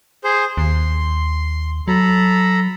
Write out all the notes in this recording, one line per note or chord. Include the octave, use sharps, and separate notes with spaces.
G#4 C5
D#2 C6
F#3 A4 A#5 B5